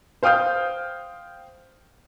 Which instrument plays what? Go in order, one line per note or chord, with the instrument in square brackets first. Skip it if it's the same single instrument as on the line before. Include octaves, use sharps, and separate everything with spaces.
[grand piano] C5 F5 G5 D#6 F6 G6